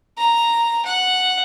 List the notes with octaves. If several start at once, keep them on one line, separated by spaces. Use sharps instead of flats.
A#5
F#5